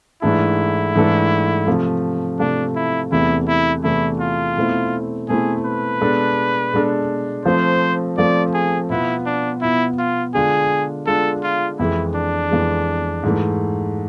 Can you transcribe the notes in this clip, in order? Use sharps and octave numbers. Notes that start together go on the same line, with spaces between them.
G#2 E3 A3 D4 E4 A4
G#2 E3 A3 D4 A4
C3 F3 A3
C3 F3 A3 D4
E4
E2 C3 E3 A3 E4
E4
E2 C3 E3 A3 E4
F4
B2 A3 C4 E4
B2 A3 C4 E4 G#4
B4
B2 G#3 D4 A4
B2 G#3 D4 A4
F3 A3 C4 C5
F3 A3 C4 D5
G#4
B2 B3 E4 F4
D4
B2 B3 E4 F4
F4
D3 G#3 D4 F4 G#4
D3 G#3 D4 F4 A4
F4
F2 E3 G#3 E4
D4
F2 E3 G#3
G#2 E3 A3